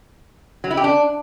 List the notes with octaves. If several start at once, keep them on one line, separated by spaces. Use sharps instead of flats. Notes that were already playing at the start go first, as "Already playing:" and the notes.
F#3
E4
G4
D4